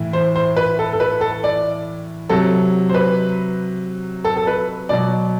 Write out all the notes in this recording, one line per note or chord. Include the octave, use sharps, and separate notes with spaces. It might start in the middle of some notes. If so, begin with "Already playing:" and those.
Already playing: A2 E3
C5
C5
B4
A4
A4
B4
A4
D5
C3 F#3 A4
C5
B4
A4
A4
B4
B2 F#3 D5